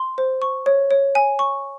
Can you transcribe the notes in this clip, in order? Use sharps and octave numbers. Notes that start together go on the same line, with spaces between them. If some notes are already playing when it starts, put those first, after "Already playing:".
Already playing: C6
C5
C#6
C#5
C#5
G#5
C#6